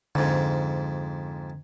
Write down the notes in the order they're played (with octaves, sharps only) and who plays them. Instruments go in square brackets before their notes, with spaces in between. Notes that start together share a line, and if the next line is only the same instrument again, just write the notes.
[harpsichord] F2 G#2 [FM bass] D3